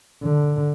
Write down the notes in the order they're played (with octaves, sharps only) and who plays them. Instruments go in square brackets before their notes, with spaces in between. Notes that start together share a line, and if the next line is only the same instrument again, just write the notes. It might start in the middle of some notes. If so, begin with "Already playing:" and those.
[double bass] D3